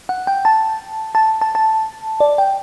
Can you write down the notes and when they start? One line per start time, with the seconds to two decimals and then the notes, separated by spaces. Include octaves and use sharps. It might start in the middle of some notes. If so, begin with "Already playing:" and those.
0.09 F#5
0.27 G5
0.45 A5
1.15 A5
1.41 A5
1.55 A5
2.20 D5
2.38 G5